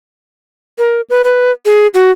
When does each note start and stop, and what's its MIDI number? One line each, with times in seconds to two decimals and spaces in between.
0.78 1.01 70
1.10 1.22 71
1.24 1.51 71
1.66 1.87 68
1.94 2.11 66